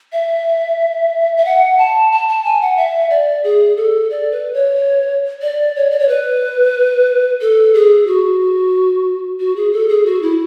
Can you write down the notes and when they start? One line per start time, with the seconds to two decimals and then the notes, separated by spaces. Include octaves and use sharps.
0.13 E5
1.37 E5
1.45 F#5
1.78 A5
2.12 A5
2.29 A5
2.44 G#5
2.61 F#5
2.77 E5
3.10 D5
3.44 G#4
3.77 A4
4.10 D5
4.32 B4
4.54 C#5
5.42 D5
5.76 C#5
5.90 D5
5.99 C#5
6.08 B4
7.41 A4
7.74 G#4
8.07 F#4
9.40 F#4
9.56 G#4
9.73 A4
9.89 G#4
10.06 F#4
10.22 E4